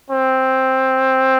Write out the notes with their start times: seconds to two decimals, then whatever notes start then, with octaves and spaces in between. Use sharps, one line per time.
0.10 C4